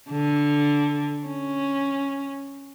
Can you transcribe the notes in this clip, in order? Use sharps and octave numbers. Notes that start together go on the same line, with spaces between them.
D3
C#4